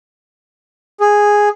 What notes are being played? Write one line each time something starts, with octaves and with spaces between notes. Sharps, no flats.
G#4